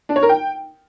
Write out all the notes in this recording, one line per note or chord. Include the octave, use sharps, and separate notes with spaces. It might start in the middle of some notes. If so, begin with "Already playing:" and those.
D4
C#5
A#4
G5